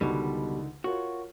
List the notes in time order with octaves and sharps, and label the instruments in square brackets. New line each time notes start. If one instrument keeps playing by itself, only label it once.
[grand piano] C#2 D3 D#3 [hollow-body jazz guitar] B2 G3
[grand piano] F4 A#4 C#5 [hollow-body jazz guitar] F#4